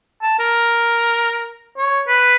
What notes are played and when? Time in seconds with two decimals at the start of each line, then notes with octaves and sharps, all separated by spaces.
0.22 A5
0.39 A#4
1.78 C#5
2.07 B4